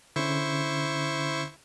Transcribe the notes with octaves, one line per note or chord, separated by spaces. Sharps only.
D3 C#4 E4 C5 C#6